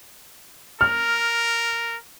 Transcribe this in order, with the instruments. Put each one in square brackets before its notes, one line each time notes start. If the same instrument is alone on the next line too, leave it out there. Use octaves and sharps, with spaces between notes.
[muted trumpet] A#4 [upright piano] F6